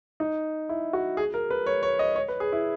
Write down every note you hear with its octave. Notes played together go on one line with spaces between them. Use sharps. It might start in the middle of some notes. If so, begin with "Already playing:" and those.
D#4
E4
F#4
G#4
A#4
B4
C#5
C#5
D#5
C#5
B4
G#4
E4